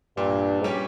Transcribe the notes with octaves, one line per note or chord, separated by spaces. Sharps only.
G2 A#2
G#2
G3 C#4 G4